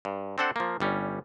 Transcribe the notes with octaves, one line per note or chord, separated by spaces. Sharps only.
G2
C4 D4 A4 C5 F#5
F3 A#3
G1 G3 C#4